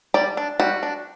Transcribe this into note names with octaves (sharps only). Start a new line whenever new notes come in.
G3 D5
D4
G3 F#4
D4